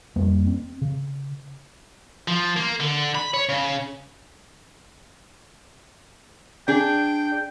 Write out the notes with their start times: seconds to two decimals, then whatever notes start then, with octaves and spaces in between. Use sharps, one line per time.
0.16 F2 G3 A#3
0.47 C4
0.82 C#3
2.28 F3
2.56 A#3
2.80 D3
3.15 B5
3.34 C#5
3.49 C#3
6.68 D4 G#4 G5